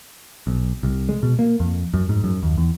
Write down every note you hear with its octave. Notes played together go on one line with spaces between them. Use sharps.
B1
C2
G#3
B2
A#3
F2
F#2
G#2
F#2
D#2
E2